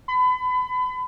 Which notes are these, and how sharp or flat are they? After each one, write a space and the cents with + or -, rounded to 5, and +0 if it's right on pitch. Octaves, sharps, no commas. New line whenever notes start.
B5 +35